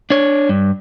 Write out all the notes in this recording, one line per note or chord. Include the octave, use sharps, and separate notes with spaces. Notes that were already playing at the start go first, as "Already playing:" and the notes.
D4 C#5
G2